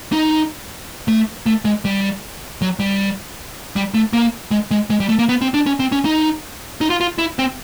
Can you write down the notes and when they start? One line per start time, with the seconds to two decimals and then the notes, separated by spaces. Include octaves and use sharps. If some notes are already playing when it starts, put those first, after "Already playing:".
0.12 D#4
1.08 A3
1.46 A3
1.65 G#3
1.85 G3
2.62 F#3
2.80 G3
3.76 G3
3.94 A3
4.13 A#3
4.51 G#3
4.71 G#3
4.90 G#3
5.00 G3
5.09 A3
5.19 A#3
5.29 B3
5.41 C4
5.54 D4
5.66 C#4
5.80 C4
5.92 C#4
6.05 D#4
6.81 D#4
6.90 F4
7.01 F4
7.18 E4
7.39 C4